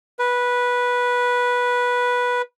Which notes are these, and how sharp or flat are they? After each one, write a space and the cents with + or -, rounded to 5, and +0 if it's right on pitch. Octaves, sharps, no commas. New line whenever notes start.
B4 -10